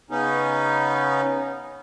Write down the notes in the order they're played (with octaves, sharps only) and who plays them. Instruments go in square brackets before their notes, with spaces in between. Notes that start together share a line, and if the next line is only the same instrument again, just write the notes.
[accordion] C#3 B3 C#4 D#4